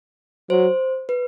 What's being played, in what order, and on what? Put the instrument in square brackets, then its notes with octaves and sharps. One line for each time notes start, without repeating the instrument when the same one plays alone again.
[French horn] F#3 [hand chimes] C5
[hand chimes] B4